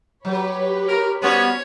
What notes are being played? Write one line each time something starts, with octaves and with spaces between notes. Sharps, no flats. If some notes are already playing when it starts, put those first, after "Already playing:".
F#3 G4 B4 C#5
A#4
G3 B3 C#4 F#4 C5 C#5